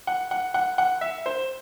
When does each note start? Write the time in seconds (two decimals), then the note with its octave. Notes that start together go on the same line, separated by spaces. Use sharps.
0.07 F#5
0.31 F#5
0.54 F#5
0.78 F#5
1.01 E5
1.26 C5